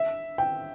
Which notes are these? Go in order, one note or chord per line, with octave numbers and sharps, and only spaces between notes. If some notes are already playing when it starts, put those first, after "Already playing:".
Already playing: E5
G5